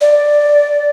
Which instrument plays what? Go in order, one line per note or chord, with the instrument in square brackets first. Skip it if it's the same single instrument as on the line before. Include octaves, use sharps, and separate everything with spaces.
[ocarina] D5